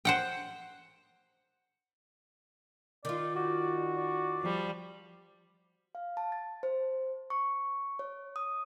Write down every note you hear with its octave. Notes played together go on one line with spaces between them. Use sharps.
C5 F#5 G5
D#3 F4 D5
F#4 D5
D5
F3 G3
F5
A5
A6
C5
C#6
C#5
D#6